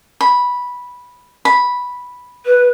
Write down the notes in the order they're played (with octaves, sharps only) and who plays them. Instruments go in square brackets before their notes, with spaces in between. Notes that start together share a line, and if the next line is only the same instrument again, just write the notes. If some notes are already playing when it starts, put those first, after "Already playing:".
[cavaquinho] B5
B5
[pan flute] B4